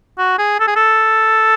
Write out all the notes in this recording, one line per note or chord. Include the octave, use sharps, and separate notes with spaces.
F#4
G#4
A4
G#4
A4